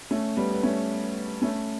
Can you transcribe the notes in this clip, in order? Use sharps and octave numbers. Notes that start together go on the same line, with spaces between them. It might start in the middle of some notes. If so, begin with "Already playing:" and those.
A3 C#4
G3 B3
B3
A3 C#4
A3 C#4